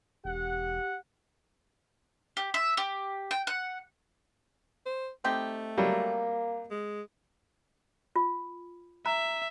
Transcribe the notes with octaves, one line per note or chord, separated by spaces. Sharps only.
E1 G4 F#5
G4
E5
G4
G5
F#5
C5
A3 C4 D#4 G4
F#3 G3 A#3
G#3
F4
E5 A#5